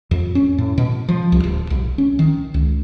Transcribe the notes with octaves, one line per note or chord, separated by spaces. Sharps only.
F2
C#4
A2
B2
F3
C2
D1
B1
C#4
D#3
C#2